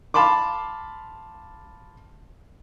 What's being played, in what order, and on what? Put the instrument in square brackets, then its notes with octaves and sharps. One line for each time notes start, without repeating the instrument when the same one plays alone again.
[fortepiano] F5 A5 B5 C6 D6